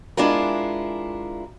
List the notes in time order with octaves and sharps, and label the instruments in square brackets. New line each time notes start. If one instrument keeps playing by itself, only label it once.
[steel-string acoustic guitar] G#3 D4 E4 F4 A#4